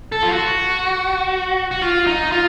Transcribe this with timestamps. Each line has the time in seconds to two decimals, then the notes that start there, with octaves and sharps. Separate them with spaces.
0.12 A4
0.23 F4
0.31 F#4
1.71 F#4
1.82 F4
2.07 D#4
2.32 F4